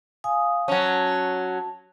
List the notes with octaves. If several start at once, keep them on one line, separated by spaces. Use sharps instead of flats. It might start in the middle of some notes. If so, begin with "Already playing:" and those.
F5 G#5 D#6
F#3 C#4 A5